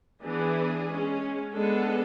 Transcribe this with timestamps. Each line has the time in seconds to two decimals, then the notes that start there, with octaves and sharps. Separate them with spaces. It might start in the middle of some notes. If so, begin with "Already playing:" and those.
0.22 E3 B3 D4 G#4
0.87 G#3 C#4
1.53 G#3 B3 D4 A4